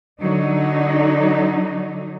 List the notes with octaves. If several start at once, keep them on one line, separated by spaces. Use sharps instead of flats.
D3 F#3 D#4